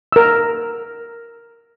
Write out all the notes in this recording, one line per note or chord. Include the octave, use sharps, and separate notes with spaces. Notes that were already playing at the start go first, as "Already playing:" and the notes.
A#4 E6